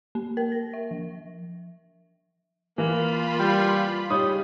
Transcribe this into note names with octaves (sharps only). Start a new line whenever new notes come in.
A#3
A#4
A#6
E5
F3
E3 A#3 F4 B5
G3
C#3 G3 D#4 C#5 D#6